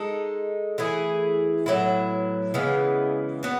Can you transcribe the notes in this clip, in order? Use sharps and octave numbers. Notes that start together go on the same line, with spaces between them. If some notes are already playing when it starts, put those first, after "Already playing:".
Already playing: G#3 D#4 A4
E3 A3 E4 G#4
A2 F#3 B3 E4
C#3 E3 G#3 B3
B3 F#4